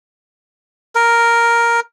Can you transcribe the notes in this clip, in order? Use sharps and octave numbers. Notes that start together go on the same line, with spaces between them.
A#4